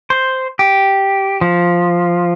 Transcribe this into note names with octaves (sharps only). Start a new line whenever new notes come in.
C5
G4
F3